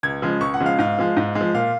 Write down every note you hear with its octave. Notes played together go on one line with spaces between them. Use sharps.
C#2 G#6
C#3 F3 G#3
C#2 C#6
F#5
C#3 F3 G#3
F5
G#2 F5
F3 G#3
G#2
G#3
F3
A#2 F5